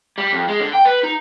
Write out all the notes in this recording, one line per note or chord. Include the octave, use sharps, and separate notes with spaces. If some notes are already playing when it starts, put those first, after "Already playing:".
G3
F2
G#3
D3
G5
B4
D#4